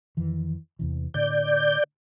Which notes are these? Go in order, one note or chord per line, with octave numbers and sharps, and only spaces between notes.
F2 D#3 E3
E2 C3 E3
A2 D3 D5 G6